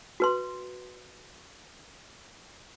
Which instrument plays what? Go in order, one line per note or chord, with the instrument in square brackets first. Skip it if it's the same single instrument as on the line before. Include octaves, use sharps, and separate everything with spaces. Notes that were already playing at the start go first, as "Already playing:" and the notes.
[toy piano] F#4 B4 C6